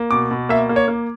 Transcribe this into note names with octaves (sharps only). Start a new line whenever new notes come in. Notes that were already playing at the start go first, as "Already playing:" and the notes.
Already playing: A#3
B2 D6
B2
A#3 E5
A#3
C#5
A#3